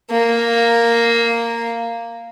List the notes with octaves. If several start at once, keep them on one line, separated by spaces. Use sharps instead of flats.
A#3